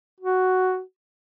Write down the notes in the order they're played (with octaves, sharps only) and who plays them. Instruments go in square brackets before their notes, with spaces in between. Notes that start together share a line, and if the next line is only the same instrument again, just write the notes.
[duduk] F#4